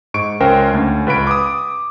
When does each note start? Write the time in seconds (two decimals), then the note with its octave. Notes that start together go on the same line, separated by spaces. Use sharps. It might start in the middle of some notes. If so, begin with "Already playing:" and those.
0.14 G#2 C#6 D7
0.40 C#2 C#4 A#4 C5 G5
0.73 D2 C#4
1.07 C#2 B4 B5 D7
1.27 D6 D#6